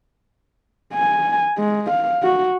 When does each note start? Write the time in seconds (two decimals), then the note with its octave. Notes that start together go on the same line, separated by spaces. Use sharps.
0.94 G#5
1.58 G#3
1.90 F5
2.23 F#4